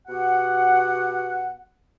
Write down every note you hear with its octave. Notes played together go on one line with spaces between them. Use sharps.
B2 G4 F#5